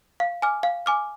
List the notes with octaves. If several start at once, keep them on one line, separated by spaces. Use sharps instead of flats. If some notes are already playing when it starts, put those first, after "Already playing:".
F5
G#5 D6 F6
F5
G#5 D6 F6